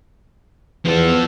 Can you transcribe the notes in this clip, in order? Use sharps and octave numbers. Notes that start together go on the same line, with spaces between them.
E2 F3 B3 A4